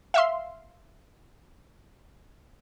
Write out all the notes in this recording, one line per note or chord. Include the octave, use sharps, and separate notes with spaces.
E5 F5 C6